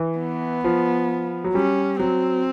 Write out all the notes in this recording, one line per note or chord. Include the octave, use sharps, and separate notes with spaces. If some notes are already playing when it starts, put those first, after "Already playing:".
Already playing: E3
B3
F3
F#3
G3 C#4
F#3 C4